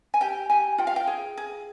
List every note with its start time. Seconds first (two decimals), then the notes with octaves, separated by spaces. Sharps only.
0.14 G#5
0.21 G4 G5
0.50 G4 G#5
0.78 F4 G5
0.87 F5
0.96 G5
1.07 G#4
1.37 G#4